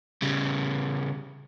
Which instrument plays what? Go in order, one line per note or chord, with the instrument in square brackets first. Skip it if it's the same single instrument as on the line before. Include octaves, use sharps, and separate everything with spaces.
[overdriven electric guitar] C#3 G3